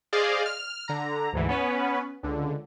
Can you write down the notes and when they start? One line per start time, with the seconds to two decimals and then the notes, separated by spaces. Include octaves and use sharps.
0.13 G#4 C5 D5 D#5 F5
0.46 F6
0.88 D3 A#5
1.33 D2 G#2 E3
1.49 B3 C#4 B4
2.23 C#2 D3